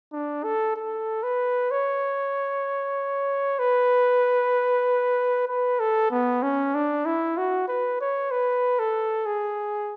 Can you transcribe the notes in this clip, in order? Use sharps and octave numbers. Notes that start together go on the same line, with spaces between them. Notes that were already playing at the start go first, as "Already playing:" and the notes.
D4
A4
A4
B4
C#5
B4
B4
A4
B3
C#4
D4
E4
F#4
B4
C#5
B4
A4
G#4